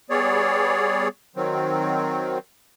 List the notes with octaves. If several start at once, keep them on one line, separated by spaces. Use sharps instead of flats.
G3 B3 G#4 C#5 D5
D#3 F#3 C4